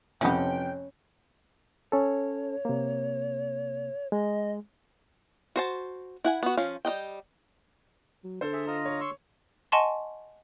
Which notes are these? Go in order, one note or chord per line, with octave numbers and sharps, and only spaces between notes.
F2 C3 E3 F3 B3 C#4 G5
C#4 A4 C#5
C3 A#3
G#3 D#5
F#4 C5 A5
E4 F#5 G#5
B3 F#4
F3 C#4 F5
G3 B4 D#5 G5
F#3
D3 A4 C5
G#4 E5
F4 D#5 A#5
C#5
C6 C#6 E6
D#5 F#5 G#5 A5 C6 C#6